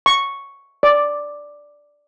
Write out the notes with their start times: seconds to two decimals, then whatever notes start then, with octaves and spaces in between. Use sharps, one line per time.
0.06 C#6
0.83 D5